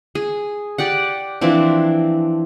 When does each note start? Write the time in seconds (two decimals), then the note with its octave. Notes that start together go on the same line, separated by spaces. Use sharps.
0.15 G#4
0.78 G4 D5 F#5
1.41 E3 F3 C4 D4